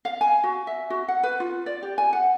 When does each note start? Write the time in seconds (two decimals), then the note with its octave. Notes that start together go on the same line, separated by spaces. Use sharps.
0.05 F5
0.21 G#5
0.44 F#4
0.67 E5
0.90 F#4
1.08 F#5
1.23 B4
1.40 F4
1.66 D5
1.83 G4
1.98 G#5
2.13 F#5